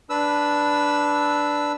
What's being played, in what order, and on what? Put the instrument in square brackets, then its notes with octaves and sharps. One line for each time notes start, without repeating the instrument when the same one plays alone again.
[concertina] D4 B4 E6